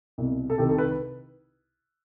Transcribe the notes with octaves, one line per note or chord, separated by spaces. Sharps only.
C2 B2
A4
C2 C3 D#3 G4
A4
B4